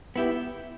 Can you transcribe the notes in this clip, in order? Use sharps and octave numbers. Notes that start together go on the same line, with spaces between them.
B3 E4 G4